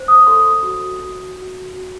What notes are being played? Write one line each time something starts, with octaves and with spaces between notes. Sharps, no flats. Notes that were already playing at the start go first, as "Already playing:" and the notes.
Already playing: C5
D#6
A4 C6
F#4
F#4
F#4
F#4